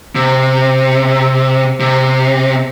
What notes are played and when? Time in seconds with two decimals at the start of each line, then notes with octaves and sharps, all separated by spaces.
0.15 C3
1.80 C3